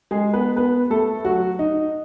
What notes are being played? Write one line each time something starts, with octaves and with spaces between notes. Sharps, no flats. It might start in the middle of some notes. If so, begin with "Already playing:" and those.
G#3 G#4
B3 B4
B3 B4
A3 A4
F#3 F#4
D#4